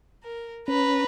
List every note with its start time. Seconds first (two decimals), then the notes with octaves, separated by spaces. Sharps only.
0.23 A#4
0.68 C#4 B4 A#5